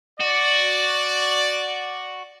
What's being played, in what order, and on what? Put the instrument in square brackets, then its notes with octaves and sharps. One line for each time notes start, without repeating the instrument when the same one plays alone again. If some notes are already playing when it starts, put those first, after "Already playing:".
[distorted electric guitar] F#4 [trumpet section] D5